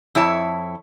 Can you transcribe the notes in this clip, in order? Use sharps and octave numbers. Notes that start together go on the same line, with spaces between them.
F2 E4 C#5 A5